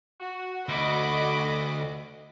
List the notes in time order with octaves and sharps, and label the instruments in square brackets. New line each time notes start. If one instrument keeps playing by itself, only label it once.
[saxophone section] F#4
[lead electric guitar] D2 [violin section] D#5 B5 D6